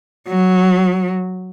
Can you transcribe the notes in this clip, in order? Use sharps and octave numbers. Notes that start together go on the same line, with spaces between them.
F#3